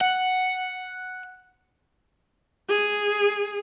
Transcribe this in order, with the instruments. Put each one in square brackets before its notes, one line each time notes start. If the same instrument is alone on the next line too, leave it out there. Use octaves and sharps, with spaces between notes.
[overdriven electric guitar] F#5
[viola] G#4